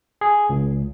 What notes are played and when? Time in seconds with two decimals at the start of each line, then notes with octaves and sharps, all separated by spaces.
0.21 G#4
0.49 C#2